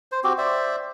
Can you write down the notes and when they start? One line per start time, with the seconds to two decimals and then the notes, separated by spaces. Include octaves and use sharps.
0.12 C5
0.24 C4 F#4 G4
0.38 C5 D5 E5